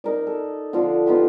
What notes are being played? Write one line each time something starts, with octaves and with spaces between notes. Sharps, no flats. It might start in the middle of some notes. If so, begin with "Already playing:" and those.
D#4 A#4 D5
A4
D3 F3 D4 F4
B3 D#4 F4 G4